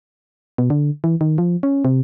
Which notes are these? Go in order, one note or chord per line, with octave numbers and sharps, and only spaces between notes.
B2
D3
E3
D#3
F3
C#4
C3